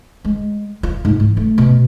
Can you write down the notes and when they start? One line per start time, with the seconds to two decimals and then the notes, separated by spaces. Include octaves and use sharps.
0.25 G#3
0.83 F4
1.05 G#2
1.20 E3
1.37 A3
1.58 B2